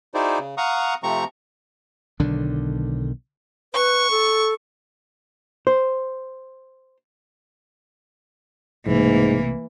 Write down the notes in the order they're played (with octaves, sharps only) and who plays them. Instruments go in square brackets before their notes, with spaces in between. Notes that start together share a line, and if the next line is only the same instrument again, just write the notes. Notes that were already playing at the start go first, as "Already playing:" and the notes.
[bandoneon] D#4 E4 F#4 G#4 C5 D5
C#3
F5 F#5 A#5 C#6 D#6
C3 F3 A3 C4 A#5 C#6
[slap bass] B1 D3 D#3 D4
[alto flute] B4 [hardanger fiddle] C#6
[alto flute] A4
[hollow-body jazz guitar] C5
[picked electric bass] B1 C3 A3 [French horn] G#2 [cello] E3 A#3